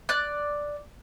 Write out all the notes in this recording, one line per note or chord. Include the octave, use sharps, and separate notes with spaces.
D5 F#6